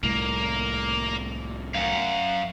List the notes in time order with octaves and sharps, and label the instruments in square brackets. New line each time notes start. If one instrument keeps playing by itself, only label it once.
[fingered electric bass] C2 A2 [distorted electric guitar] A#3
[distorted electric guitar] F#2 [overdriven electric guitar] F5 F#5